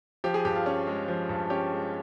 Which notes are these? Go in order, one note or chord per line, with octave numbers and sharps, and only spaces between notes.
F3 G4
G#4
G2 G4
F4
C#4
G#3
F3
G2
C#4 G4
G#3